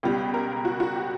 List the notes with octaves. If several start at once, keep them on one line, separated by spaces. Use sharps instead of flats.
C#2 B2 G3 G4
A#4
F#4
F#4
G4